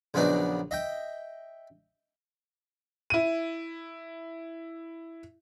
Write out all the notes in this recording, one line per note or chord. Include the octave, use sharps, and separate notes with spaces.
A#1 C#3 F#3 B3 D4 D#4
D#5 E5 G5
E4 D#7